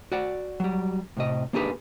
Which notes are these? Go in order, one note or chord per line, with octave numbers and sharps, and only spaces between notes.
F#4 D5 F#5
F#3 G3
A2 C3 D#5
A#3 D4 D#4 G4 G#4 B4